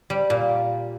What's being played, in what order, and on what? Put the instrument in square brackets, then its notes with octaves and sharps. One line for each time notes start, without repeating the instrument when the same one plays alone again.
[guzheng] G3
A#2